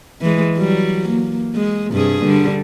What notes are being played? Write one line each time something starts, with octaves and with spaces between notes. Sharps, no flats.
E3 G#3
F#3 G3
A#3
G#3
G2 C3 G#4
D3 G3